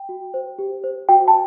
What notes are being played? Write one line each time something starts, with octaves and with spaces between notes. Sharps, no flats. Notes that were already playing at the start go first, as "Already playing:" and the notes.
Already playing: G5
F#4
C5
G4
C5
F#4 G5
A5